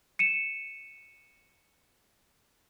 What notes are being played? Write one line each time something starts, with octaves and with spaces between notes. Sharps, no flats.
C#7 D#7 E7